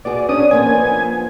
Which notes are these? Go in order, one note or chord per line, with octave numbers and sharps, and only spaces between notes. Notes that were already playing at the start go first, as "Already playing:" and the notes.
B3 F#4 G#4 D5
C#4 D4 D#6
F3 A#3 B3 G#5